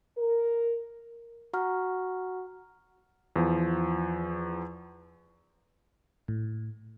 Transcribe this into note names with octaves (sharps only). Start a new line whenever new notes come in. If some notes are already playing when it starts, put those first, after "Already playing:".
A#4
F#4 F#5 A#5 C#6 F6
E2 F3
A2